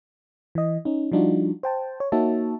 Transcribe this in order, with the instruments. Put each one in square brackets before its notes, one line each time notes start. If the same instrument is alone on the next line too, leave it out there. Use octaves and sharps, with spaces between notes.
[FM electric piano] E3 D#5
C#4 D#4
F3 G3 D4 D#4 F4 F#4
C5 G5 A5
C#5
A#3 D#4 F#4 C#5 E5 A5